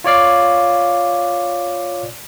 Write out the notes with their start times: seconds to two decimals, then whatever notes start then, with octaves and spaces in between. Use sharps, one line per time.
0.04 F4 C#5 D5 F5